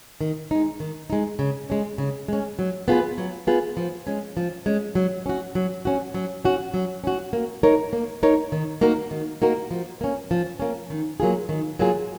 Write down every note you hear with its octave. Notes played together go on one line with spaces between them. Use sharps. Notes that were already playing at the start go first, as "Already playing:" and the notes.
D#3
G#3 D#4
D#3
G#3 D#4
C#3
G#3 C#4
C#3
G#3 C#4
F#3
B3 F4 G#4 B4
F#3
B3 F4 G#4 B4
F3
G#3 C#4
F3
G#3 C#4
F#3
C#4 F#4
F#3
C#4 F#4
F#3
C#4 F#4
F#3
C#4 F#4
A#3
D#4 A#4 C#5
A#3
D#4 A#4 C#5
D#3
A#3 D#4 F#4 A#4
D#3
A#3 D#4 F#4 A#4
F3
A#3 C#4
F3
A#3 C#4
D#3
F#3 A#3 F4 G#4
D#3
F#3 A#3 F4 G#4